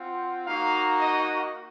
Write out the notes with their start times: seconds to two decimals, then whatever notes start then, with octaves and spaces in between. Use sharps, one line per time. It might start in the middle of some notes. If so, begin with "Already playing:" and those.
Already playing: C4 F4 F#5
0.47 A#3 D#4 F#4 F5
1.00 D#5